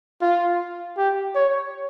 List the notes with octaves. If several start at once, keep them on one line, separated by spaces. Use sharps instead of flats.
F4
G4
C#5